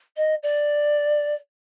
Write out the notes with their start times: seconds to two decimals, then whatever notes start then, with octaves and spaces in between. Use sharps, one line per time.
0.16 D#5
0.43 D5